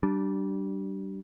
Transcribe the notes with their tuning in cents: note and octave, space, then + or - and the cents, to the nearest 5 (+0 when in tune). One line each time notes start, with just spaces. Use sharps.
G3 -20 D4 +0